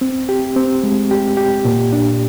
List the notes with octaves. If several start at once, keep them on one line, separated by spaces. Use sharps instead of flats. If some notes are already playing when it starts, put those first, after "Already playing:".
C4
G4
C4
G#3
G4
G4
A#2
D4